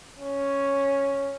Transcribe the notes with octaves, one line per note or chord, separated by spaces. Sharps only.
C#4